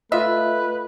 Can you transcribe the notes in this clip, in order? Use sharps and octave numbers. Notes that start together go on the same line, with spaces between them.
A3 F4 B4 D#5 E5